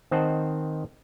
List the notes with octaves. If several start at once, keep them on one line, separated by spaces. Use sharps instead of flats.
D#3 C4 C5 D#5 F#5 A5